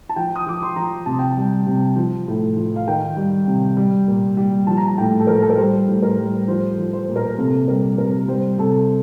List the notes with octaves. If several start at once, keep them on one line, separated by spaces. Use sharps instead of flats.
A5
F3 G5
D#6
F3 D6
C6
F3 A#5
C3 A5
G5
A5
G3
C3
F3
A2
F3
F5
D#3 G5
G3
C3
G3
A#2
G3
F3 A5
A#5
A5
A2 G5
A4
F3 A#4
A4
A#4
G3 C5
A2
A#4
G3
F3 C5
F3
C5
A#2
A#4
C3 A4
G3 A#4
C3 A#4
G3 C5
C3 A4